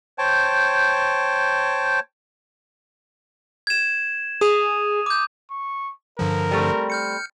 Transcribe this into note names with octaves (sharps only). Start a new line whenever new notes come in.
C5 C#5 G5 A5
G#6 E7
G#4 D#6 D#7 F7
D6 G6
C#6
G2 D3 F3 A#4
G3 A3 C4
F6 G6 C#7